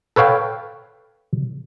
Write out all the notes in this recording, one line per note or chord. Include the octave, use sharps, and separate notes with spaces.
A4 B4 C#5 F5 G5